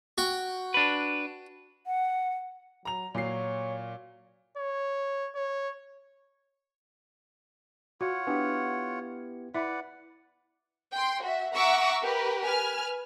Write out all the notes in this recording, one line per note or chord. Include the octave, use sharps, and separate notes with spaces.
F#4 G5
D4 B4
F#5
F#3 A#5 F7
A#2 F#3 C#5 C7
C#5
C#5
F4 F#4 C#5 F#5
B3 D4 E4 G4
E4 B4 D5 E5 F#5
G5 C6
F#4 E5
E5 F#5 A#5 C#6 D6 E6
G4 A#4 B4
B4 G#5 F6